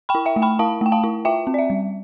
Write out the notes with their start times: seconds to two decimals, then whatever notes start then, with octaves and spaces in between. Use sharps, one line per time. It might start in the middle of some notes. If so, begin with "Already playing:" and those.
0.09 G5 B5
0.15 E4
0.26 E5 G5
0.36 A3
0.42 G5 B5
0.59 E4 F5 A5
0.81 A3 G5
0.92 F5 A5
1.04 E4
1.25 F4 E5 G5
1.47 C4
1.54 D5
1.59 E5
1.70 G3